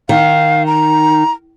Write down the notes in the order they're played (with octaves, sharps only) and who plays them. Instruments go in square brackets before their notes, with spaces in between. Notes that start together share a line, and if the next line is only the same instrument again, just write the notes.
[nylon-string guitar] D#3 [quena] F5
[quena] A#5